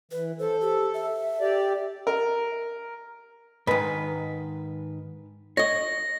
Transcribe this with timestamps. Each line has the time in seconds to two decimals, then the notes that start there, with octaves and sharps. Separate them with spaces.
0.11 E3 B4
0.39 A4 C5
0.61 G4
0.94 E5
1.40 G4 D5
2.07 A#4
3.67 G#2 D#3 B4
5.57 C#5 D#5 A#6